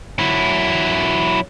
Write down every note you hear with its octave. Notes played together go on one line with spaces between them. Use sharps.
F#3 E4